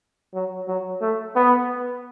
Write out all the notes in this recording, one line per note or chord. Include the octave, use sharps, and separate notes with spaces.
F#3
F#3
A3
B3